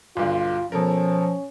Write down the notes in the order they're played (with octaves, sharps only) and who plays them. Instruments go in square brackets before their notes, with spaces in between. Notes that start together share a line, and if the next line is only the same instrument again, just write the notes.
[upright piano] B1 G2 D3 [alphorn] F4
[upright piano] B2 A4 A#4 [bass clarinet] F3 [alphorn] C#4